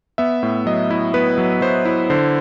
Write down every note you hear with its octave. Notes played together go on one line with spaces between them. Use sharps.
B3 E5
A2
F#3 D#5
E4
B3 B4
F#3
F#3 C5
E4
D3 C5